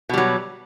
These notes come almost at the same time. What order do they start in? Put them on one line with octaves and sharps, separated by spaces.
B2 G3 F#3